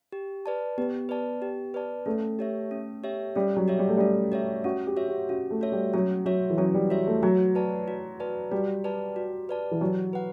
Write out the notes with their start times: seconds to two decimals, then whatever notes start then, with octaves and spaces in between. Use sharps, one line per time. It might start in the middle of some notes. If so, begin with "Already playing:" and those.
0.12 G4
0.46 B4 D5 A5
0.77 B3 G4
1.09 B4 D5 A5
1.42 G4
1.74 B4 D5 A5
2.06 A3 C#4
2.39 G4 C#5 E5
2.71 C#4
3.04 G4 C#5 E5
3.36 G3 C#4
3.56 F#3
3.68 G4 C#5 E5
3.79 G3
3.88 A3
3.97 G3 C#4
4.32 G4 C#5 E5
4.64 C#4 F#4
4.87 G4
4.96 F#4 C#5 E5
5.08 G4
5.29 C#4 F#4
5.50 A3
5.61 F#4 C#5 E5
5.72 G3
5.93 F#3 C#4
6.25 F#3 F#4 C#5 E5
6.50 E3
6.58 F#3 C#4
6.74 G3
6.90 F#4 C#5 E5
7.07 A3
7.23 F#3 F#4
7.55 B4 D5 A5
7.88 F#4
8.20 B4 D5 A5
8.51 G3 F#4
8.84 B4 D5 A5
9.16 F#4
9.49 B4 D5 A5
9.71 E3
9.81 F#3 G4
10.13 B4 F#5